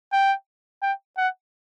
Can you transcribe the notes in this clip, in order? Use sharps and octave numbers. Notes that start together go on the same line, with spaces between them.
G5
G5
F#5